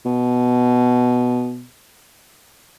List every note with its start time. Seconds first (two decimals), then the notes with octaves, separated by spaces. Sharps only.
0.05 B2